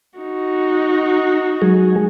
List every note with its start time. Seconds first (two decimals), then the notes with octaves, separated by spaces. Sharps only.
0.19 D#4 F#4
1.62 F#3 G#3 G#4